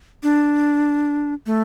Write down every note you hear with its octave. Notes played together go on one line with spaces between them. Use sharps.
D4
A3